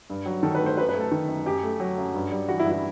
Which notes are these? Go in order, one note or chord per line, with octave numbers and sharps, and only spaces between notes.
G2
F#3
D#3 A4
B4
A3
C5
F#2 B4
B4
A3
A4
D#3
F#2
F#2 G4
A3
F#3
F#2
G2
G3
E3 F#4
E4
G2
E4